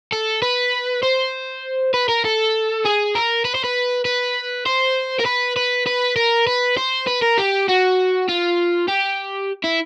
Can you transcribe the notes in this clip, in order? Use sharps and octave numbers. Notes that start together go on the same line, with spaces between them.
A4
B4
C5
B4
A#4
A4
G#4
A#4
B4
C5
B4
B4
C5
A#4
B4
B4
B4
A#4
B4
C5
B4
A#4
G4
F#4
F4
G4
E4